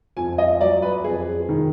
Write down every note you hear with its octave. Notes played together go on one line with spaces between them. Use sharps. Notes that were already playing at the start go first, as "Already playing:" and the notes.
F2 G#5
D#5
F#3 D5
B4
F2 G#4
D#3